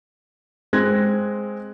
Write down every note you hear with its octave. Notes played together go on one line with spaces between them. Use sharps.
G#3 C4 F#6 G#6 A#6